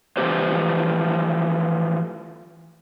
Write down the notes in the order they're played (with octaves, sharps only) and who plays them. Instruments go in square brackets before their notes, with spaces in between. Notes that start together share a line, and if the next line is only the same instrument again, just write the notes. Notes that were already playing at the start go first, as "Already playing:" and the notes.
[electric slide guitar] E3 F3 A3 B3 G4 C5